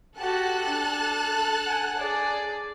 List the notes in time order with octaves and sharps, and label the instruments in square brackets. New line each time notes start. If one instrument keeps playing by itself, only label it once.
[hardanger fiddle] F#4 G4 [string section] A4 A5 F#6
[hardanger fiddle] D4
F#5 G#5
G#4 D5